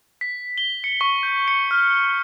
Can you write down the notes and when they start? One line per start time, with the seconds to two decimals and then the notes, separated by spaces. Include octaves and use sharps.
0.21 B6
0.58 G7
0.84 C#7
1.01 C#6
1.23 G6
1.48 C#7
1.71 F6